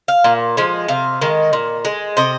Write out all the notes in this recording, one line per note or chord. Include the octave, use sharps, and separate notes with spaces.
F5
A#2
F3 G#3
C3 F5
D#3 G#3
A#2
G#3
C3 D#5